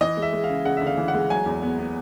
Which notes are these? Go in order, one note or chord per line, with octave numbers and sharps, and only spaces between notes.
E3 D#5
G#3
E5
G#3
F5
C#3
C#3 F#5
D2 E5
F5
E3
F#5
G#3
F#3 G#5
E2
B3
B3